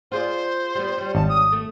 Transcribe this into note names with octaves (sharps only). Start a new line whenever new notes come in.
F4 G#4 C5 D5
G3 B3
G3 C#4
G#1 A5
D#6
A3